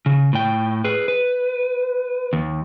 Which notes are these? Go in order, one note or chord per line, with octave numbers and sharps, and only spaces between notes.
C#3
A2 G5
G#4 B4
B4
D#2